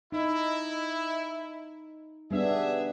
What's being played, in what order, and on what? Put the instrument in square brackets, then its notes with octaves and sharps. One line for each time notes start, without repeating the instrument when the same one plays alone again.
[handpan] D#4 [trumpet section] E4
[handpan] G3 B3 D4 [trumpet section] G#4 E5